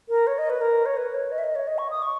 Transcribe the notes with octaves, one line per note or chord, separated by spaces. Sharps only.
A#4
C#5
D#5
B4
A#4
C#5
B4
C#5
D#5
E5
D#5
C#5
D#5
C#6
D#6
C#6